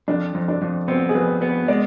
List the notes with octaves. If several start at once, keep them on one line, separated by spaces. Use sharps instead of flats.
F2 D4
F2
D4
F2
B3 C4
G#4
F2 B4
B3 B4
G#3 D5